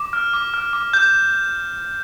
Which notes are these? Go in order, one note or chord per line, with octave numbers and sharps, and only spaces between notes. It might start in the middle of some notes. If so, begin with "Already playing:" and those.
Already playing: D6
F6
D6
F6
D6
F6 G6
D6